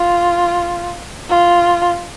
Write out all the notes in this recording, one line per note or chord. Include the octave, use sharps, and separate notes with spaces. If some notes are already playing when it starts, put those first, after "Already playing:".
Already playing: F4
F4